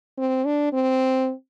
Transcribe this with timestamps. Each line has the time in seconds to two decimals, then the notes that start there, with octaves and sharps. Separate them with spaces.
0.17 C4
0.45 D4
0.73 C4